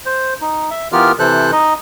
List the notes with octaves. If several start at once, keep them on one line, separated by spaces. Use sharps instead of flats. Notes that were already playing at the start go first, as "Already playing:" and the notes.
C5
D#4
E5
E3 B3 F4 G4 A#4 F6
C3 E3 A4 C5 F#6
D#4 D#5